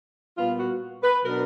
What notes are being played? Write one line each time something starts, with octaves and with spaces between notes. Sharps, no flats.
A#2 G3 B3 F4
F#4
B4
B2 F#3 B3 D4 A#4